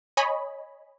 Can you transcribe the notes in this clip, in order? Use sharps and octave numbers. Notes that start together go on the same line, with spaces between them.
C#5 D#5 G#5 B5